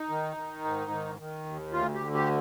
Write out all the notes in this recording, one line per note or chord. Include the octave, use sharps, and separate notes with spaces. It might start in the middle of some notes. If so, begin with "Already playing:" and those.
Already playing: D#4
D#3
D#3
G#2
D#3
D#3
D#2
D2 F4
G4
D3
G4